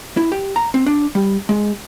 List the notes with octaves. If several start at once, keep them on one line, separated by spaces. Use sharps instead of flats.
E4
G4
A#5
C4
D4
G3
G#3